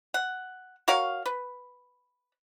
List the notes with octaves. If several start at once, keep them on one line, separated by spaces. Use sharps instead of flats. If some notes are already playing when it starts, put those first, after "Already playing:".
F#5
F#4 A#4 C#5 F5
B4